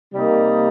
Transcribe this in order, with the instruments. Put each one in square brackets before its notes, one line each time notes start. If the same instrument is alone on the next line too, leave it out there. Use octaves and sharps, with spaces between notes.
[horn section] C3 G3 A#3 D#4